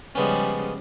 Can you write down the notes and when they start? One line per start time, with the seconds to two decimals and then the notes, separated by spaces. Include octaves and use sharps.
0.15 C#3 F3 G3 G#3 B3 C#4